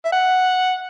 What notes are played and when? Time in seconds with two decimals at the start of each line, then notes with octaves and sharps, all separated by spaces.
0.05 E5
0.12 F#5